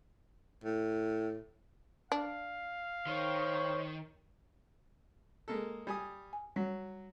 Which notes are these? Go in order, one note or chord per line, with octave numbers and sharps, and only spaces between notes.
A2
D4 F5
D#3 C5 C#5
G#3 A#3 A4
G3 G#5 D#6
G#5
F#3 G3